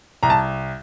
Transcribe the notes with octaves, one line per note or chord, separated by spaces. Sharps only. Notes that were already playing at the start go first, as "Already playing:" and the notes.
C2 A#5
A5